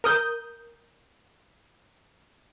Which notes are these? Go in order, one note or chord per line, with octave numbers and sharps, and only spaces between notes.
A#4 D#6 G6